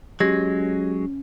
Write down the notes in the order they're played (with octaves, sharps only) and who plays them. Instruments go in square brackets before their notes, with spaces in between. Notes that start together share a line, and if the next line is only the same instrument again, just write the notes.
[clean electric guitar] F#3 G#3 [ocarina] C#4 [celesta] G4 G#6 A#6